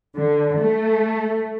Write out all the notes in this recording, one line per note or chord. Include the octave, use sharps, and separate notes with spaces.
D3
A3